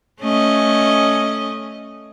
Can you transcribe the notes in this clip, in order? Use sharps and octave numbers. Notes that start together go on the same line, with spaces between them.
A3 C#4 D#5